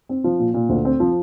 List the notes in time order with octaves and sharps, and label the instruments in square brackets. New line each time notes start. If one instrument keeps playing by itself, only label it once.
[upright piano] C4
F3
A#2
A#2
D2
C4
F3